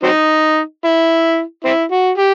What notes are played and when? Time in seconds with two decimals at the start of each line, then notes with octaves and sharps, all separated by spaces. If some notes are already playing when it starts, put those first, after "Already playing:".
0.03 F#3 C4 D#4
0.84 E4
1.65 C4 E4
1.91 F#4
2.18 G4